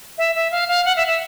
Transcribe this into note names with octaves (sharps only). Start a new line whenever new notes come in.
E5
E5
F5
F5
F#5
E5
E5